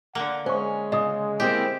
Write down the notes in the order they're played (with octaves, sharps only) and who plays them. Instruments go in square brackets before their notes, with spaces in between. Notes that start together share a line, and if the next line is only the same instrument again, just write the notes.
[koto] D3 A#3 [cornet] F#5
[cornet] G#3 [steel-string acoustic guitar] C#4 [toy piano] C5 C#6
[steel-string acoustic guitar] C#3 [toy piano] D#5 D#6
[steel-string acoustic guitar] A#3 C4 E4 [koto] G4 [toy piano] D#5